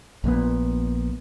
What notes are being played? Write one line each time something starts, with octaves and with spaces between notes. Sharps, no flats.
A#1 A#2 F3 B3